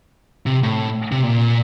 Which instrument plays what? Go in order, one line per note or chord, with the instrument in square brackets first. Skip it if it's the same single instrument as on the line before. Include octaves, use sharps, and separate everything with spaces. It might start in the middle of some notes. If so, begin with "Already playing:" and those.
[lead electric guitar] C3
A2
C3
A#2